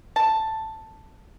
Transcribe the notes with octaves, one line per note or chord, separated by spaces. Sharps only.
A5